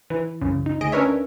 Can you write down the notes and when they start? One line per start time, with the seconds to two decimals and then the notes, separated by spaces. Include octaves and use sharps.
0.10 E3 E4
0.41 C2 F#2 C#3
0.66 D#4
0.81 D2 G#4 D#5 D7
0.92 C#4 D4 A#4 B4 C#5 E5